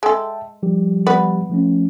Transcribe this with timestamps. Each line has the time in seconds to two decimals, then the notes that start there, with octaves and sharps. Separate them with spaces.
0.03 G#3 A4 E5 G5 A5
0.63 F3 G3 G4
1.06 B3 B4 D5
1.49 F3 A3 C#4